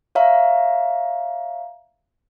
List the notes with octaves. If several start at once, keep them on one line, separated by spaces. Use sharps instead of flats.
C#5 E5 F5 A#5